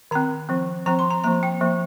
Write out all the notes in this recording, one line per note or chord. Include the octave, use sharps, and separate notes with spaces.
D#3 C4 A#5
F3 C4
F3 C4 A#5
C6
A#5
F3 A#3 A#5
G5
F3 A#3